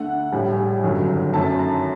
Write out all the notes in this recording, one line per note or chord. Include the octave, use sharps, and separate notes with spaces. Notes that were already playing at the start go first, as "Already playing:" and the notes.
Already playing: D2 D3 A3 F#5
A#1 A2 G3
G1 F#2 D#3 F#3
F#2 D#3 F#3 A3 A5
A#5